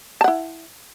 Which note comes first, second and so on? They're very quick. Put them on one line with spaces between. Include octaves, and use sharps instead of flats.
A5 F#5 E4